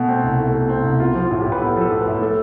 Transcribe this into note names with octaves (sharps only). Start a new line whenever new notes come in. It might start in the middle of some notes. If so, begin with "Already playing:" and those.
Already playing: B2 A3
C4
C2
A3
B2
C4
C2
B3 F4
F3
F4
A2
G4
A2
B4
B3 A4
F3 A4
A2
B4
A2
A3 A4